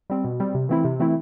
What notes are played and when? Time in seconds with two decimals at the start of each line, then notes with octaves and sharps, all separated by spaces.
0.10 G3 C4
0.24 B2
0.40 G3 C4
0.55 C3
0.69 E3 A3 C4 E4
0.84 C3
1.00 E3 A3 C4 E4